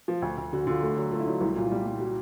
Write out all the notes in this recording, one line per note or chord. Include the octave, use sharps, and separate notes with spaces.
F3
D2
D2
D3 F#4
D3 F4
A3 F#4
F#3
A3 F4
E4
F#3 D#4
C2 E4
A#2 F4
G3
G3
F#4